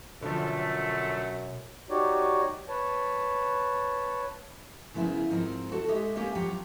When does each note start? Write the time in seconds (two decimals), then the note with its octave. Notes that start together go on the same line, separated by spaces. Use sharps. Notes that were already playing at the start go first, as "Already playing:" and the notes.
0.22 F#2 B2 D3 F3 A3
1.90 D#4 F#4 G4 C#5 D5
2.69 B4 C#5 A5
4.94 C#3 F3 B3 E4 G#4 A#4
5.30 G#2 F3 C4 D#4 G4 A#4
5.72 F#4 A4 A5
5.88 G#3 G4 D#5 E5
6.16 A#3 C4 C#4 G4
6.35 F2 F3 F#3 G4 F#5 A#5